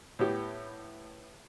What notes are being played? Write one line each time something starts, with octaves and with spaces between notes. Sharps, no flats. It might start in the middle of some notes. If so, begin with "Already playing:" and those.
A2 B3 G4